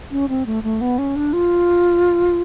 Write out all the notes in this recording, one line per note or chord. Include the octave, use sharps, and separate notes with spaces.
C#4
C4
A3
A3
B3
C#4
D4
F4